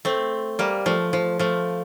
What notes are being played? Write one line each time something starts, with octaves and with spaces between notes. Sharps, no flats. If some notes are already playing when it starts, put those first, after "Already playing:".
A3 C4
G3 A#3
F3 A3
F3
F3 A3